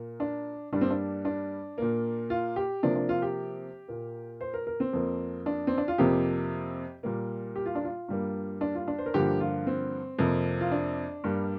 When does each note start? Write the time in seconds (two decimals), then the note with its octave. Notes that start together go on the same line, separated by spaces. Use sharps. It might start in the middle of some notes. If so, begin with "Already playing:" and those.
Already playing: A#2 A#3
0.20 D4
0.72 G2 G3 A#3 D4
0.81 C4
0.90 D4
1.25 D4
1.78 A#2 A#3
2.30 F4
2.56 G4
2.83 C3 F3 A#3 D4
2.95 D4
3.09 F4
3.22 G4
3.88 A#2 A#3
4.41 C5
4.54 A#4
4.67 A#4
4.80 C4
4.93 F2 F3 A#3
5.46 D4
5.67 C4
5.78 D4
5.88 F4
5.98 F2 C3 F3 A#3 G4
7.03 A#2 G3 A#3
7.56 G4
7.66 F4
7.75 D4
7.84 F4
8.08 G2 G3 A#3
8.61 D4
8.75 F4
8.88 D4
8.98 C5
9.06 A#4
9.14 G2 D3 F3 A#3 G4
9.40 F4
9.67 C4
10.19 F2 C3 F3 A#3
10.61 F4
10.71 D4
11.24 G2 G3 A#3